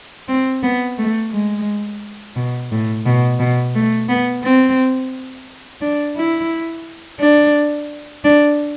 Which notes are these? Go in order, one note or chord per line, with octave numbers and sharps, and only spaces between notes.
C4
B3
A3
G#3
B2
A2
B2
B2
A3
B3
C4
D4
E4
D4
D4